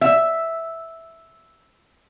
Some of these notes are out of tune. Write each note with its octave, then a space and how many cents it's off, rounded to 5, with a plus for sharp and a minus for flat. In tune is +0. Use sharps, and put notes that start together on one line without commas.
E5 -5